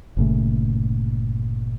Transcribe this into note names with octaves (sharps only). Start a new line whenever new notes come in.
G1 A#2 C#3 A3